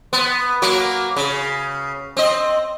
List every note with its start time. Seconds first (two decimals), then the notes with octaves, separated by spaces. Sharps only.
0.13 B3
0.62 F#3 A#3 F#4
1.16 C#3
2.17 C4 D#5